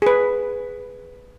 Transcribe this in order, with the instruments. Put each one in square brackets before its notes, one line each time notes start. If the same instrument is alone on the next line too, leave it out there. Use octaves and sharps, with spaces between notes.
[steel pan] G#4 B4